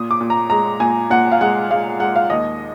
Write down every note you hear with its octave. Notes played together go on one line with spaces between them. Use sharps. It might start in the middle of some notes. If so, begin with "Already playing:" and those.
Already playing: A#2 D#6
D6
A#2
A#5
G#3 A#5
A#2 G#5
A#2 F#5
F5
G#3 F#5
G#3 F5
G#3 F#5
F5
D#2 D#5